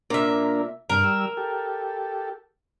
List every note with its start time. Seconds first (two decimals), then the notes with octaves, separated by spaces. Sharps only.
0.10 A#2 A#3 D4 A#4 E5
0.90 G2 A#4
1.04 G3 E6
1.37 G4 A4